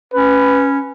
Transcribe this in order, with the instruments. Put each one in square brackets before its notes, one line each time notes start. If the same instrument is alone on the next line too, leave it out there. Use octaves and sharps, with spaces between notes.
[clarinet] C#4 [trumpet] B4